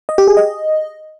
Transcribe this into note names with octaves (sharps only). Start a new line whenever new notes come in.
D#5
G4
G#4
D#5